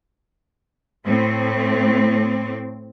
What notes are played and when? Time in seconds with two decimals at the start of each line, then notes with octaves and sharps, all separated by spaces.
1.05 A2 A3 C4